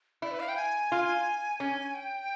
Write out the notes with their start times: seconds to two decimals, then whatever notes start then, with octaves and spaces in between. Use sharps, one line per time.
0.22 E4 D5
0.31 B4
0.40 F5
0.49 G5
0.56 G#5
0.92 F4
1.60 C#4
1.94 G5